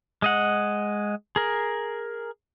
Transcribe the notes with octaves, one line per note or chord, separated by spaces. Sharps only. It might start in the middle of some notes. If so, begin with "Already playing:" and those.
G#3 D#5 F#5
G#4 A#4